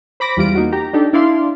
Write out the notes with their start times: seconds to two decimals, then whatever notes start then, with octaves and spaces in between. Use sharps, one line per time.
0.20 C5 B5 D6 A#6
0.37 E2 G3 F4 D7
0.55 A#3 D#4 F#4
0.72 G4 A#5
0.93 D4 D#4 G4 A4
1.13 D4 E4 D5 F5 C6